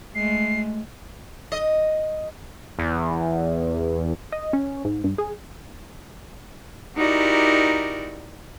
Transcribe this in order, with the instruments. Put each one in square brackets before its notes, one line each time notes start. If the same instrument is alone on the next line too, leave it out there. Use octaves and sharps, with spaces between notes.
[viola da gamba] G#3 A3 [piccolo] C7
[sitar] D#5
[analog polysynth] E2
[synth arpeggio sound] D#5
C#4
G#2
G2
G#4
[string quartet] D#4 E4 F#4 G4 A#4 D5